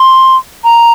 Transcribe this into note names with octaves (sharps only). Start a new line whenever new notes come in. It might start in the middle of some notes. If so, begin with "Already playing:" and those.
Already playing: C6
A#5